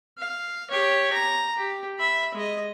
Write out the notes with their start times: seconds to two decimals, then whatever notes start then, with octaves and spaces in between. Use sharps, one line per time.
0.18 F5
0.70 G4 C#5
1.13 A#5
1.57 G4
1.98 E5 B5
2.34 G#3 D#5